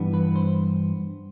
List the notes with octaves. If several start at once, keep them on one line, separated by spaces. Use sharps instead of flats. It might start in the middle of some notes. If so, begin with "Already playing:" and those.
Already playing: G2 E3 G3 B3 D4
B4
C5